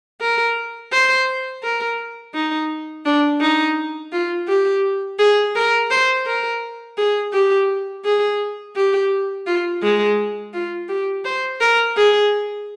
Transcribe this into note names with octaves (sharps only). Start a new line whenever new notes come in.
A#4
C5
A#4
D#4
D4
D#4
F4
G4
G#4
A#4
C5
A#4
G#4
G4
G#4
G4
F4
G#3
F4
G4
C5
A#4
G#4